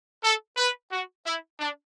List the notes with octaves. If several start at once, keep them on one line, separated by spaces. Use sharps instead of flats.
A4
B4
F#4
E4
D4